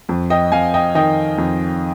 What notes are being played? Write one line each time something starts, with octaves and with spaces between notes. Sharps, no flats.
F2
D#5 G5
F2 F5 G#5
D#5 G5
D#3 D#5 G5
F2